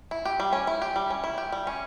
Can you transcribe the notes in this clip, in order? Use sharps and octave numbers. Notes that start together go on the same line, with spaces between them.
E4
G4
G3
C#4
E4
G4
G3
C#4
E4
G4
G3
C#4